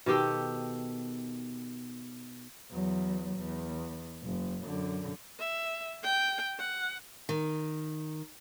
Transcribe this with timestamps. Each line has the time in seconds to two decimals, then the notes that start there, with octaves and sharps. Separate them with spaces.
0.06 B2 D#3 G4 A4
2.72 E2 F#3
3.37 E2
4.23 F#1
4.64 F#2 D3
5.39 E5
6.03 G5
6.59 F#5
7.29 D#3